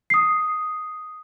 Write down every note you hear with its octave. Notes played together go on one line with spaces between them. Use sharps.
D#6 C7